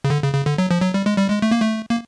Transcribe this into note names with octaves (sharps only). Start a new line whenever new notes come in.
C#3
D3
C#3
C#3
D3
F#3
F3
F#3
G3
G#3
G3
G#3
A3
A#3
A3
A#3